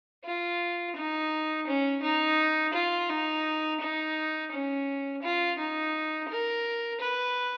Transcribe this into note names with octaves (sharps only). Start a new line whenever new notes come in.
F4
D#4
C#4
D#4
F4
D#4
D#4
C#4
F4
D#4
A#4
B4